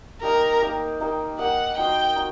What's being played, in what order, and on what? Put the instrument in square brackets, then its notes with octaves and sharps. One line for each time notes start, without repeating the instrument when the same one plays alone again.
[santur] A#3 D#4 G4 [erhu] A#4
[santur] A#3 D#4 G4
A#3 D#4 G4
[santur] A#3 D#4 G4 [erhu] F#5
[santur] D#4 F#4 C5 D#5 [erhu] G5
[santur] D#4 F#4